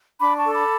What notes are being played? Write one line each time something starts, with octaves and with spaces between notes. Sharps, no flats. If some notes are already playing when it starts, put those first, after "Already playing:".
D4 B5 D6
A5 C#6
A4
B5 D6